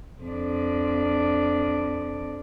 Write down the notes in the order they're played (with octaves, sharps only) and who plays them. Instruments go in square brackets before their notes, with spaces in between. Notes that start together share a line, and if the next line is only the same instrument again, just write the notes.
[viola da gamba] F2 D4